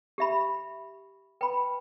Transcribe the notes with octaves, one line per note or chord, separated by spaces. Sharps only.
G4 E5 B5
B4 G5 B5